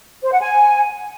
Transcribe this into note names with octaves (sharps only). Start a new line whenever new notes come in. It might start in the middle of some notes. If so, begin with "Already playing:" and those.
C5
F#5
G#5